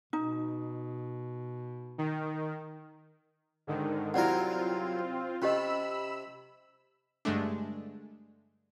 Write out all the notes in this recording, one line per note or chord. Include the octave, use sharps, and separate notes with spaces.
B2 D#4
D#3
G#2 D3 D#3
C2 F#3 C4 E4 F4 A#4 D5 F#5
C3 C#4 G4 D#5 B5 E6
G2 D3 G#3 A3 D4